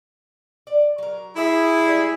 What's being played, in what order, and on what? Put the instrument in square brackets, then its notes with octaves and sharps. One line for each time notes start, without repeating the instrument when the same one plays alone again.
[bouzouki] D5
F#3 A#4
[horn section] E4 G#4
[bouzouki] F#3 G3 A3